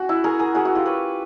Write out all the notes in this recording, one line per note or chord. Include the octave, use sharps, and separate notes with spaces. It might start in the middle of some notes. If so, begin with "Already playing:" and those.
Already playing: C#4 F#4
E4
G#4 A#4
G#4 A#4
F#4 G#4
E4 F#4
F4 G4
B4 C#5